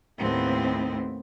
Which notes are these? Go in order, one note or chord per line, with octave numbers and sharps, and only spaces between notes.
D#2 A2 B3 C4